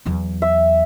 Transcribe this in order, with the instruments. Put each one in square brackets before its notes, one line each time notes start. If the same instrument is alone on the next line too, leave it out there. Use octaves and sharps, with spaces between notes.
[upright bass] E2 F#3
[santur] E5